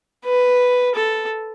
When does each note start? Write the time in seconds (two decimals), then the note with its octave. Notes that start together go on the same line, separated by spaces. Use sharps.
0.25 B4
0.95 A4